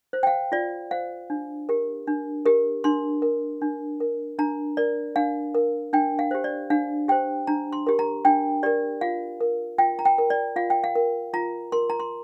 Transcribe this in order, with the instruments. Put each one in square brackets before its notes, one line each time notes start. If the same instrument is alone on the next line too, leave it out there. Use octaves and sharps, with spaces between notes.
[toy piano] C5
G5
F5
F4 D5
C5 F5
D4
G4 A#4
D4
G4 A#4
D4 C6
A#4
D4
A#4
D4 A#5
A#4 D5
D4 F5
A#4
D4 G5
F5
G4 C5
D5
D4 F5
G4 C5 G5
D4 A#5
C6
G4 A#4
A#5
D4 G5
G4 A#4 D5
F4 F5
A#4
F4 G5
A#5
G5
A#4
D5
F4 F5
G5
F5
A#4
F4 A#5
A#4 C6
A#5
C6